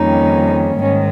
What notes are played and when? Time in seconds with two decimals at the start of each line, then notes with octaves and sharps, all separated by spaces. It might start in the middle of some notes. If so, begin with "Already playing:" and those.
Already playing: F2 D#3 G3 A#3 C#4 D#4
0.80 G#2 D#3 C#4